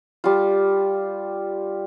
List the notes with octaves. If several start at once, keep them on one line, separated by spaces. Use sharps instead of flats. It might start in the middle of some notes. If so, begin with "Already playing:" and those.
G3 F4